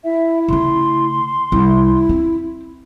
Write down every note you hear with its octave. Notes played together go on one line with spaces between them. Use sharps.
E4 E5
C#3 A3 C6
C2 E4
C4